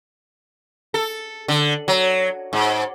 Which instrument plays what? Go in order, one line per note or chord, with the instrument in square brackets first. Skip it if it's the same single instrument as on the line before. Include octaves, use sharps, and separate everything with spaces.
[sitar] A4
D3
F#3
G#2